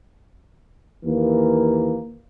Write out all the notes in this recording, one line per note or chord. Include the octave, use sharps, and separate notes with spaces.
D#2 E3 A#3